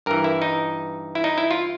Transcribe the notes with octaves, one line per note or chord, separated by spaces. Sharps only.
G2 E3 A#4
E4
D#4
E4
D#4
E4
F4